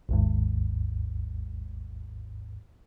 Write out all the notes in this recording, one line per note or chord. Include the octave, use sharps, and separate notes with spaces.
G#1 D#2 G#2